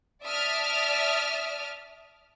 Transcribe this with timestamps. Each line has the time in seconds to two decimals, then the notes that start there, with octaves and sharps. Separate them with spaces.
0.24 D5 E5 A5 D#6 F6